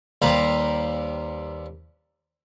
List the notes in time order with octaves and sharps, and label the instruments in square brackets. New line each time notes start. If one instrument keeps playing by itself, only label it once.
[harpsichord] D#2 G3 B4 C5 F5 A#5